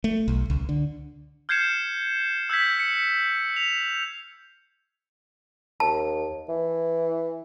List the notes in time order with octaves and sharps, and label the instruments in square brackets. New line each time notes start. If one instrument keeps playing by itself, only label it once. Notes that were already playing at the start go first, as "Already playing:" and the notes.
[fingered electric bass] A3
B1
C#2
D3
[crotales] F6 G6 G#6 C7 C#7 E7
E6 G6 G#6 B6
C#7
F7
[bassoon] D#2 [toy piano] A5
[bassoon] E3